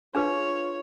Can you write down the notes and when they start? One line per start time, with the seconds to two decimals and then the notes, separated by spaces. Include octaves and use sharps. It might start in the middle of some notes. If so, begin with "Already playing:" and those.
0.15 D4 F4 G#4 B4 C#5